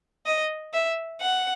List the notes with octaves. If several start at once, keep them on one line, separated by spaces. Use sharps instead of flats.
D#5
E5
F#5